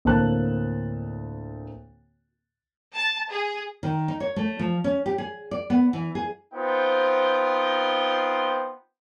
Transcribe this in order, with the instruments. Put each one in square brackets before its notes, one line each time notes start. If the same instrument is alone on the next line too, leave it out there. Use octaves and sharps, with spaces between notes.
[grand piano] D2 A2 A#3 C4 A5 F#6
[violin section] A5
G#4
[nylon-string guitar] D#3
D#4
C#5
A3
F3
C#4
G4
G#4
D5
B3
E3
G#4
[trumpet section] B3 C4 D#4 F4 C5 G5